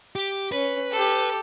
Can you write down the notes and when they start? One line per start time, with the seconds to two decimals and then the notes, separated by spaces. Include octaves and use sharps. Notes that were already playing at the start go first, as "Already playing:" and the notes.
0.16 G4
0.52 C#4 B4
0.91 G4 A4